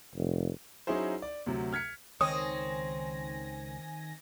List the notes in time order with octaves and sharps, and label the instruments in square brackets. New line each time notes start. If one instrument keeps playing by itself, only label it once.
[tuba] F1
[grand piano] F#3 C#4 D#4 E4 G#4 C5
D5
D2 C3 F#3
F6 G#6 B6 C#7
[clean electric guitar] C#2 C#5 [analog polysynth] D#3 G#5 A#6 [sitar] C4 [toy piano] D#6